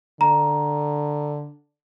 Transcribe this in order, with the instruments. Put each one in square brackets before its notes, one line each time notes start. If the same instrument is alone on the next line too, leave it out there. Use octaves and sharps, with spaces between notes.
[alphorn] D3 [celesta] A#5